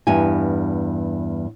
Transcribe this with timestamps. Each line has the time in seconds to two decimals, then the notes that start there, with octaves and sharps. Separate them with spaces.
0.07 E2 G2 G4 G#5